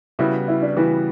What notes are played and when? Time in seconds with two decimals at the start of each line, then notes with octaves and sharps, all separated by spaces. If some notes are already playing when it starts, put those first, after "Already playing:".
0.19 C#3 G3 B3 E4 F#4
0.48 E4
0.62 D4
0.76 C#3 E3 G3 B3 F#4